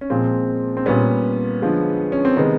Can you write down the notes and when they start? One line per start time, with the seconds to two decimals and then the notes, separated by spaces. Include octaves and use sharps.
0.01 C#4
0.10 A#2 F3 G#3 C4
0.77 C4
0.85 A#2 G3 B3 C#4
1.62 D3 F3 G#3
2.12 C#4
2.25 C4
2.37 C3 D#3 G#3 B3